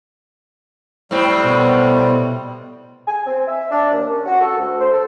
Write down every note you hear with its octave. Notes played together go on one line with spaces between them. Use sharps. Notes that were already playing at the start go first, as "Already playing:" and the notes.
A2 G3 C4
B2
G#5
C4
E5
D4
D#2
C#4
F#4
A4
D2
C5
A4